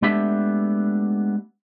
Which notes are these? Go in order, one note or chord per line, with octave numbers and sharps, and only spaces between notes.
G#3 A3 B3 D4 G4 E5